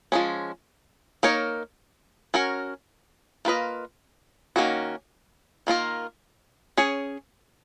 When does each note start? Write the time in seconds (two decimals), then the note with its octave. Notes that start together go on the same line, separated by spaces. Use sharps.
0.12 F3 G#3 C#4
1.23 A#3 D#4 A#4 C#5
2.34 C#4 F#4 A#4 C#5
3.45 A#3 F4 B4 D#5
4.56 D#3 A#3 C#4 F#4
5.67 D#3 A#3 F4 A#4
6.77 C#4 G#4 C#5